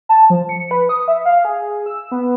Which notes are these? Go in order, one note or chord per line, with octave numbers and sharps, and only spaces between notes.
A5
F3
C#7
B4
D#6
E5
F5
G#4
E6
B3